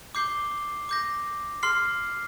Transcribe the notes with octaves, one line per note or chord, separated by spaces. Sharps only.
D6 G6 C7 G7
D6 G6 A#6
C6 F6 C7